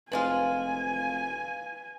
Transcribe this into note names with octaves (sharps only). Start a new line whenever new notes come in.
F1 F3 G#3 F4 B4 F5 G#5